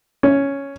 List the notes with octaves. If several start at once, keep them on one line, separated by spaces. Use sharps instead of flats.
C#4